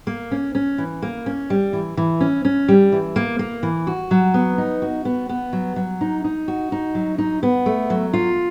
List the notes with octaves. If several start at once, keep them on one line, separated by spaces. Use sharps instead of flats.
A#3
C#4
C#4
E3
A#3
C#4
G3
E3
E3
C#4
C#4
G3
E3
A#3
A#3
E3
F#4
F#3
B3
D#4
F#4
B3
B3
F#3
F#3
D#4
D#4
F#4
D#4
F#3
D#4
B3
A3
F#3
F4